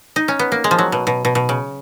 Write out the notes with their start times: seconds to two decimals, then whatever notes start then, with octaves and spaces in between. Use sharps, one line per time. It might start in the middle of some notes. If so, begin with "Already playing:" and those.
0.16 D#4
0.28 C#4
0.39 B3
0.52 A#3
0.64 G#3
0.71 F3
0.79 F#3
0.92 B2
1.07 B2
1.25 B2
1.35 B2
1.49 C#3